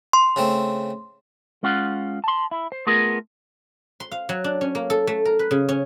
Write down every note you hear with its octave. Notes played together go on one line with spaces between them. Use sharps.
C6
C#3 A3 C4
G#3 C#4 F4 F#5
A5 C6
E4
C5
A3 B3 F4 G#4 A#4
C6
F5
F#3
D4
C#4
A#3
A4
A3
A#4
B4
C#3
C#4